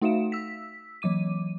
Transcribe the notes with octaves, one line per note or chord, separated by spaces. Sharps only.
A3 D#4 F#4 E5 F5 E7
E6 B6
E3 F#3 D6 D#7